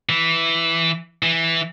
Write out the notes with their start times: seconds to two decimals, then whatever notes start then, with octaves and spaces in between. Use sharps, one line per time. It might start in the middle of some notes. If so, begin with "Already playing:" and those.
0.09 E3
1.23 E3